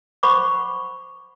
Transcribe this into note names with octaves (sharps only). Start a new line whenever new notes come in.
C5 F#5 B5 C#6 D6